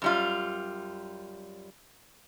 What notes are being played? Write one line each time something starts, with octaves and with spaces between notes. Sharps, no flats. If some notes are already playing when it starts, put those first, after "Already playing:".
F#2 G3 F4